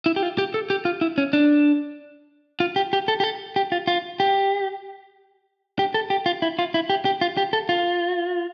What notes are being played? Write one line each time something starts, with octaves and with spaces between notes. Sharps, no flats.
E4
G4
F4
G4
A4
G4
F4
E4
C#4
D4
F4
G4
G4
A4
G4
A4
G4
F4
F4
G4
G4
A4
G4
F4
E4
F4
E4
G4
G4
F4
G4
A4
F4